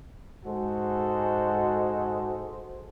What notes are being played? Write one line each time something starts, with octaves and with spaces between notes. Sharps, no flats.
G#2 G#3 F#4 A4 C5